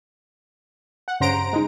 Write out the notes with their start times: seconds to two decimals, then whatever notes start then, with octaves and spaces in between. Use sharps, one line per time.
1.08 F#5
1.20 G2 C#3 C5 A#5 A#6 D7
1.53 G#3 D#4